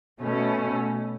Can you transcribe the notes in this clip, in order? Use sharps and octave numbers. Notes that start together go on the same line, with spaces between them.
B2 A3 C#4